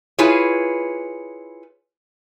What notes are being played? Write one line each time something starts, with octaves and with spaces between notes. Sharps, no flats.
E4 F4 G#4 B4 C#5